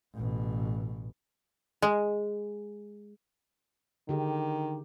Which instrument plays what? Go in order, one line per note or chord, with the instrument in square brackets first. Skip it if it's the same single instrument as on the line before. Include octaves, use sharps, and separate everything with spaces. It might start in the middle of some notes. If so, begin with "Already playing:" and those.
[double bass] A1 B2
[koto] G#3
[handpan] D3 G4 G#4 [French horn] D#3